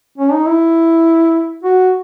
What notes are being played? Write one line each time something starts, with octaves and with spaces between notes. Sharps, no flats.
C#4
D#4
E4
F#4